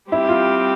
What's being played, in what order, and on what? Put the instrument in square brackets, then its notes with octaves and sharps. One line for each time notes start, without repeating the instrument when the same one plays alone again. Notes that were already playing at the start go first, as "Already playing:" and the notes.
[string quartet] G3 C4 G4 [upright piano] E4
[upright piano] F4